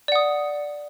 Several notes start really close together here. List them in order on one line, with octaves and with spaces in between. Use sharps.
D5 F#5 D#6